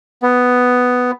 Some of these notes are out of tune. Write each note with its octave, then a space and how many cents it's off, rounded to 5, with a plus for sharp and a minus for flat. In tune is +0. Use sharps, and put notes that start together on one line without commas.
B3 +5